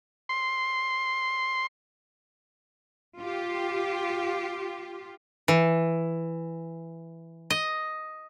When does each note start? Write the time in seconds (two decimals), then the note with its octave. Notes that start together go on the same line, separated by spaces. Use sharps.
0.29 C6
3.19 F4 G4
5.48 E3
7.50 D#5